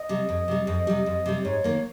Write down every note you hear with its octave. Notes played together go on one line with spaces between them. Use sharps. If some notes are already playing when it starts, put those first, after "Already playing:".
Already playing: D#5
C3 G3
F2
C3 G3
F2 D#5
C3 G3
F2
C3 G3
G#2 C#5
D#3 A#3